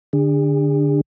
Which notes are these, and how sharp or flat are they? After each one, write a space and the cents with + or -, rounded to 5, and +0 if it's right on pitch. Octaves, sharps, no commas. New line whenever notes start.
D3 +0 D4 +5 G#4 -40